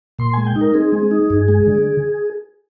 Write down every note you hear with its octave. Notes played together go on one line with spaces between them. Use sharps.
A#2 C6
G#3 G#5
G5
D#4
A#4
C4 G#4
G#3
D#4
G2
G#3
D3